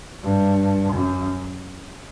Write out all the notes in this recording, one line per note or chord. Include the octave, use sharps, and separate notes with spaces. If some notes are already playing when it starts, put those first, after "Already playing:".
G2
F#2